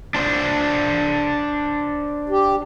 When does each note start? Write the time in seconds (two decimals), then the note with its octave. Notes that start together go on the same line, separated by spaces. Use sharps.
0.15 D4 C5
2.29 G4